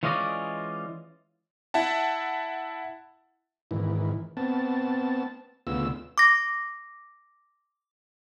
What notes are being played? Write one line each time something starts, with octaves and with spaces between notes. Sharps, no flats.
E3 G#3 C#4 F4 D5 D#5
E4 E5 F#5 A5
G#2 D#3 E3
B3 C4 A5
D2 C#3 B3 F4 E6
D6 A#6